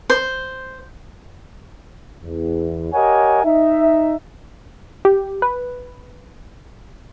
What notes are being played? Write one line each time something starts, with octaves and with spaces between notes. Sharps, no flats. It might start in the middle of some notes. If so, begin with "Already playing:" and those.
C5
E2
G4 A#4 C#5 D#5 F#5 G#5
D#4 E5
G4
B4